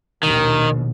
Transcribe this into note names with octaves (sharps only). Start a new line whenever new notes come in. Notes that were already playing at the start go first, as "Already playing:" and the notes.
A#1 D#2 B2 D#3